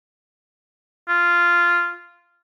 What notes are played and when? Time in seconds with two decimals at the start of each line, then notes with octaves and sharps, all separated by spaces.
1.09 F4